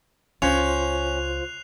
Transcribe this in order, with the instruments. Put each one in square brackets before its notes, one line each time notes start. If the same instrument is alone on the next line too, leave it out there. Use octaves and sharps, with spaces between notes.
[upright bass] C#2 [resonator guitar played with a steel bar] C#4 [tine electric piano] F4 C5 [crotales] F#6 C7 F7